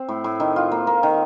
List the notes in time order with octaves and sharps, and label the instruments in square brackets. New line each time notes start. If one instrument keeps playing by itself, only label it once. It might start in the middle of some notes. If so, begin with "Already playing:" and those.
Already playing: [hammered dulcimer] C4
A2
A2
D#3
F4
A#3
A#3
D#3